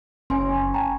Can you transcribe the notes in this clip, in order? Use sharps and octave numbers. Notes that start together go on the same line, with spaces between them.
F#1 C#4 G#5 C6
G5 A5 A#5